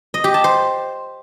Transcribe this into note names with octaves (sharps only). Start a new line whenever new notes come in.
D#5
G4
A5
C5